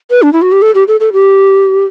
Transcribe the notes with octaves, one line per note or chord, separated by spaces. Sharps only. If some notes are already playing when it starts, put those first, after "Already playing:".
B4
D4
E4
F#4
G4
A4
G4
A4
A4
G4